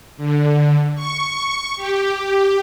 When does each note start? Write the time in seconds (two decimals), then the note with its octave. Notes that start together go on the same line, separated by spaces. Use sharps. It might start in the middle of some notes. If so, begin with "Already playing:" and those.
0.16 D3
0.95 C#6
1.76 G4